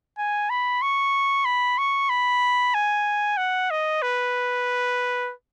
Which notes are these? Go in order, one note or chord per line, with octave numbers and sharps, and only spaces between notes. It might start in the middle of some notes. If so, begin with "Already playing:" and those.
G#5
B5
C#6
B5
C#6
B5
G#5
F#5
D#5
B4